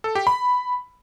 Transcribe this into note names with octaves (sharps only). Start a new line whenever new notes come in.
A4
G4
B5